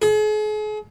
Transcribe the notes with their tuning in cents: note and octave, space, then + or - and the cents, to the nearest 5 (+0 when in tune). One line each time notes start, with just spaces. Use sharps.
G#4 +40